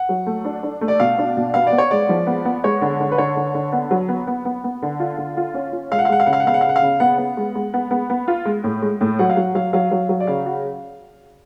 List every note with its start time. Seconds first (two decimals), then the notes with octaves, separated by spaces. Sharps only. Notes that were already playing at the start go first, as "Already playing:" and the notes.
Already playing: F#5
0.09 F#3
0.26 A3
0.45 D4
0.63 D4
0.81 A3
0.88 D5
1.00 B2 F5
1.18 D4
1.37 B2
1.54 B3 F5
1.67 D5
1.72 B3
1.78 C#5
1.91 G#3 D5
2.09 F3
2.27 B3
2.45 B3
2.64 G#3 C#5
2.81 D3
3.00 D3
3.12 B4
3.18 D3 C#5
3.36 D3
3.54 D3
3.72 B3
3.91 F#3
4.09 B3
4.27 B3
4.45 B3
4.64 B3
4.82 D3
5.00 F4
5.18 D3
5.37 F4
5.54 C#4
5.72 F4
5.91 G#3 F5
5.99 F#5
6.05 F5
6.09 G#3 F#5
6.20 F5
6.26 C#3 F#5
6.33 F5
6.40 F#5
6.46 B3 F5
6.54 F#5
6.61 F5
6.64 C#3
6.69 F#5
6.76 F5
6.82 C#3
7.00 B3 F#5
7.18 B3
7.37 G#3
7.55 G#3
7.74 B3
7.91 B3
8.10 B3
8.28 F4
8.45 G#3
8.64 A2
8.82 G#3
9.01 A2
9.19 F#3 F#5
9.30 F5
9.36 F#3 F#5
9.55 F#3 F5
9.73 F#3 F5
9.91 F#3
10.09 F#3
10.20 D5
10.27 C#3 F5
10.46 F#4